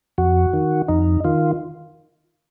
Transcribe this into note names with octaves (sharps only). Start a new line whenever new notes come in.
F2 F#4
D#3
F2 D#4
D#3 F4